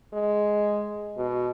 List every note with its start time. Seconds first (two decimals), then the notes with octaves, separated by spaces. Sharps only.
0.13 G#3
1.17 B2